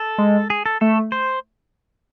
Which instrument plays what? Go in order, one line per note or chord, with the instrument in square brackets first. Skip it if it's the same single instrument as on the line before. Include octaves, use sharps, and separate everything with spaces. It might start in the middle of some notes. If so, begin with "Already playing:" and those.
Already playing: [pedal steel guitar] A4
[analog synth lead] G#3
[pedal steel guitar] G#4
A4
[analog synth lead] A3 [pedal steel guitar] A4
[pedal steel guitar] C5